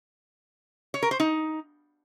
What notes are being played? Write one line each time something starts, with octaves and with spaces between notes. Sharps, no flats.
C#5
A#4
C5
D#4